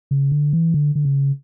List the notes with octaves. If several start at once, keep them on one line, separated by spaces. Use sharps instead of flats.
C#3
D3
E3
D3
D3
C#3